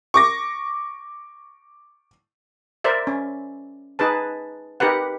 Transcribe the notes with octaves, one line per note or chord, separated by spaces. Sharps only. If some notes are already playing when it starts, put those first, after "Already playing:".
C#6 D6 A#6
A#4 C5 D5 E5
C#4
D#4 G#4 B4 A5
D#4 G4 A#4 B4 F#5